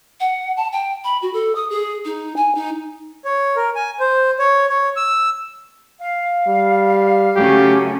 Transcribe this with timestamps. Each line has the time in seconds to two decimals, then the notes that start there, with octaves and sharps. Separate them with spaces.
0.20 F#5
0.57 A5
0.72 G5
1.04 B5
1.22 F#4
1.33 A4
1.55 D#6
1.70 G#4
2.05 D#4
2.36 G#5
2.55 D#4
3.25 C#5
3.56 A#4
3.75 G#5
4.00 C5
4.39 C#5
4.69 C#5
4.96 E6
6.00 F5
6.47 G3
7.36 C#3 F#3 A3 C#4 G4